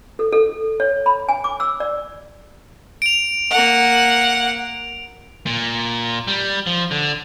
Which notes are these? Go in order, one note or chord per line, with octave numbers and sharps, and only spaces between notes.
A4
A4
C#5
B5
G#5
D6
E6
D5
D7 F7
A#3 F#5
A#2
G3
F3
D3